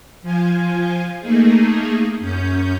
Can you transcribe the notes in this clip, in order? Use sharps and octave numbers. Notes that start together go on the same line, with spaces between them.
F3 F4 G#5
A3 A#3 D#4 G#4
F#2 C#4 G6